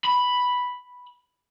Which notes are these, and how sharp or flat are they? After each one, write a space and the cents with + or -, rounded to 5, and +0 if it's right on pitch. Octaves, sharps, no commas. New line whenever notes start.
B5 +0